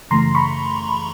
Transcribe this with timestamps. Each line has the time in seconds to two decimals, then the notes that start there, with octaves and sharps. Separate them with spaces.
0.11 F#2 C#3 E3 A3 A#5 C6
0.35 B5 C#6